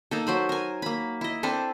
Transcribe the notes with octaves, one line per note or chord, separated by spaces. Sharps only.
A#3 D#4 A4
F#3 C5 B5
A#4 G#5
A#3 B5
E4 D#5
C4 D4 A4 B4